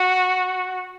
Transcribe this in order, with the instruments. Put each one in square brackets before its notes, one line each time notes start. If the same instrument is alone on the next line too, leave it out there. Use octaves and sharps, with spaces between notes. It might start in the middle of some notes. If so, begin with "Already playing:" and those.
Already playing: [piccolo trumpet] F#4